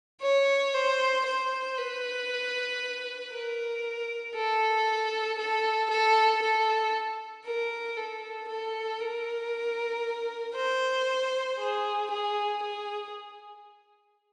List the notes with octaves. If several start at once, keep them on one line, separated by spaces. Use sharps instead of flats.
C#5
C5
C5
B4
A#4
A4
A4
A4
A4
A#4
A4
A4
A#4
C5
G#4
G#4
G#4